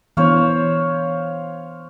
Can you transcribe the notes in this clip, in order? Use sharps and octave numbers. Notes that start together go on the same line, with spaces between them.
E3 B3 D4 C5 C#5 F5